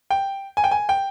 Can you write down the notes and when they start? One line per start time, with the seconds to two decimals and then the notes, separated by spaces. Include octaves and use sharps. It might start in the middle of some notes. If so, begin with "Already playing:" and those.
0.10 G5
0.57 G#5
0.64 G5
0.71 G#5
0.89 G5